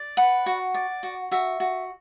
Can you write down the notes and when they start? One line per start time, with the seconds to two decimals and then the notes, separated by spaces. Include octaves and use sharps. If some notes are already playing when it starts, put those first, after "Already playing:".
Already playing: D5
0.17 B4 F#5
0.46 F#4
0.74 D5
1.03 F#4
1.31 F#4 E5
1.60 F#4